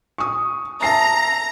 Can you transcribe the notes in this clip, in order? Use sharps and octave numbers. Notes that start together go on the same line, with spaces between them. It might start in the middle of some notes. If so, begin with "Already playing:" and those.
C#6 D#6
E5 A5 A#5 C7